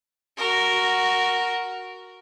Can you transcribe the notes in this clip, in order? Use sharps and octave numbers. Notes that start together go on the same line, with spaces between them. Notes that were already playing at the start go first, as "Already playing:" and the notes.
F#4 A#4